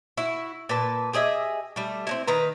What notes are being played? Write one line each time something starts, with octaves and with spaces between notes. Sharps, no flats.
E4 F#4
A#2 B4 A5
G4 G#4 D#5 E5
G3 A3
C4 D#4 E4
D#3 B4 A#5